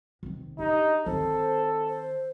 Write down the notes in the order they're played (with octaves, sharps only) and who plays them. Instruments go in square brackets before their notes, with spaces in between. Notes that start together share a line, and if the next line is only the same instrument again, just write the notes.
[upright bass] C3 D#3
[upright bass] D4 [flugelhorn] D#4 [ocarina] G4
[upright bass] D#3 C4 [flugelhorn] A4 [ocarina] C5
[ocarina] C5